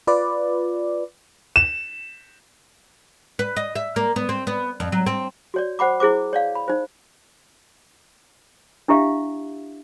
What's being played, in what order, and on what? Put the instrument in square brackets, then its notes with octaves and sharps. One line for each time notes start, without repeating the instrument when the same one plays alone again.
[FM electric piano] F4 B4 D5
[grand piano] E7
[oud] B4
D#5
E5
A#3
B3
C4
B3
F2
F#3
C4
[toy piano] F#4 C#5 D5
C5 F#5 B5 D6
E4 G#4 C5 D6
C#5 D5 F5
B5
D#4 C5
D4 E4 G4 E5 F5